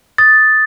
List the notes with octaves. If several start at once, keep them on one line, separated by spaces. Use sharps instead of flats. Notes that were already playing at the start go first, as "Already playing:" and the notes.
D#6 A6